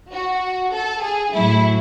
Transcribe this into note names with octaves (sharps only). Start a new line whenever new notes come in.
F#4
A4
G#4
A2 F#3 E4